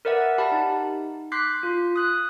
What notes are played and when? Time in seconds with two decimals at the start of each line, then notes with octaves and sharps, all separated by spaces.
0.05 A#4 B4 D5 E5 F#5
0.38 G4 F#5 A5 B5
0.52 D#4
1.32 C6 D6 F#6 G6 B6 C7
1.63 F4
1.96 D#6 F#6